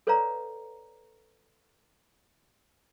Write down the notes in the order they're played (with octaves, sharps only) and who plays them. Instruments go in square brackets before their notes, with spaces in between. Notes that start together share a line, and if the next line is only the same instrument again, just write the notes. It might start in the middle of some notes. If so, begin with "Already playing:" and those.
[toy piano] A4 B4 C#5 D5 F5 A#5